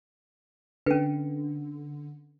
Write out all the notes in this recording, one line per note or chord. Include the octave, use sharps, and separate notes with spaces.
D3 C#4 B4